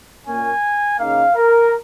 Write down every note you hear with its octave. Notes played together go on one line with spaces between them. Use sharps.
A#2 A#3 C#4 G#5
C#3 A#3 D#4 F5
A#4